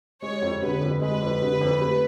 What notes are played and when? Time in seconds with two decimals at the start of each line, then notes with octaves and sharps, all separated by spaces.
0.22 G#3 C#5
0.42 F2
0.62 D3 B4
0.81 F2
1.01 G#3 B4
1.21 F2
1.42 D3
1.61 F2
1.81 A3